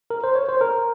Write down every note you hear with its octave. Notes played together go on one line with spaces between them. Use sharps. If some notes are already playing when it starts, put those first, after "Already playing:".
A#4
C5
C#5
C5
A#4